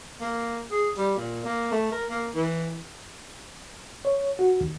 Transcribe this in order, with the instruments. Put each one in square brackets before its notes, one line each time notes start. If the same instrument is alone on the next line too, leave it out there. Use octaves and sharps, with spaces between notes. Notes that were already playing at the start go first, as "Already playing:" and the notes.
[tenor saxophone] A#3
G#4
G3
A#2
A#3
A3
A#4
A#3
E3
[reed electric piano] C#5
F#4
D#2